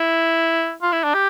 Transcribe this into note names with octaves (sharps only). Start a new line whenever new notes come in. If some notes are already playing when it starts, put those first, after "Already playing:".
Already playing: E4
F4
E4
D4
G4